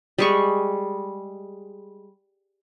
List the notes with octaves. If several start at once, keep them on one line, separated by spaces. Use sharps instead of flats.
G3 G#3 C#6